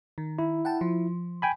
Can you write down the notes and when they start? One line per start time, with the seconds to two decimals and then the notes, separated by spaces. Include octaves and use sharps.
0.18 D#3
0.39 E4
0.65 F#5 G5 A5
0.81 F3
1.42 G5 G#5 B5